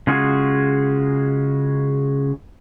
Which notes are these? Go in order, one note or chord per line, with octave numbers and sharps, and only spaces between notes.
C#3 G#3 F4 F#4 G#4